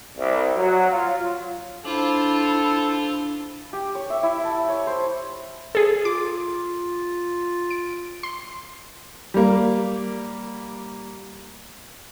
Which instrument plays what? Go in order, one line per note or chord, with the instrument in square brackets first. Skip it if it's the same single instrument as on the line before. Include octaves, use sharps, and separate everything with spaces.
[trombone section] C2
F#3
F4
[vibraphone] D4 [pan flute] E4 [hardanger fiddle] F4 C5 [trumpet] A4
[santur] G4
C#5
E5
E4
A5
C#5
C5
[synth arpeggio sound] G#4 A4
[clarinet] F4 [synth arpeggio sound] D6
[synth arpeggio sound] D7
C6
[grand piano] G3 A#3